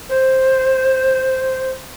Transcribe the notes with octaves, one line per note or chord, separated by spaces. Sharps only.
C5